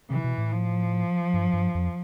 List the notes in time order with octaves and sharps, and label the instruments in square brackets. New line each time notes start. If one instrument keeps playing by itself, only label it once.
[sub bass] C3 [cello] E3
[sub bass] B2
A2
[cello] F3
[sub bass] G2
G2
F2